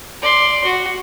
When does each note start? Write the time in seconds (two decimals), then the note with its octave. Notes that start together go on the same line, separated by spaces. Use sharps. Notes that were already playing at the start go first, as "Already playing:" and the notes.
0.22 D5 C6
0.64 F#4